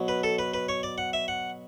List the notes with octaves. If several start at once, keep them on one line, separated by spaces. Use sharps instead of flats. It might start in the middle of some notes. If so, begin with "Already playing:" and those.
Already playing: B2 F#3
B4
A4
B4
B4
C#5
D5
F#5
E5
F#5